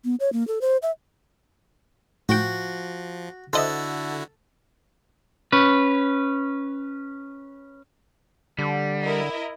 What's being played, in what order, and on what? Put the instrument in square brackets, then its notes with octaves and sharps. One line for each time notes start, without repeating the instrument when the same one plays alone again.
[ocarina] B3
C#5
A#3
A4
C5
E5
[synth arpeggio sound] A2 G5 [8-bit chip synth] F3 [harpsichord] F#4
[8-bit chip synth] D3 E4 F#4 [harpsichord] A4 [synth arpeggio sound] C5 D#5 E5
[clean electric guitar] C#4 B4
[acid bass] D3 [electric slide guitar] G3
[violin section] E4 A#4 D#5